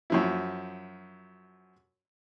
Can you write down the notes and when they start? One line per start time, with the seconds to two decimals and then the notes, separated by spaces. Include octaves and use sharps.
0.10 F#2 F3 E4